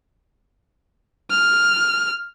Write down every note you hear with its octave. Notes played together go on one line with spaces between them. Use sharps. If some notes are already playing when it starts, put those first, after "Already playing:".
F6